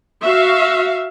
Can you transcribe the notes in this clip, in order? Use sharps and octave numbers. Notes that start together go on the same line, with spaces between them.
F#4 E5 F5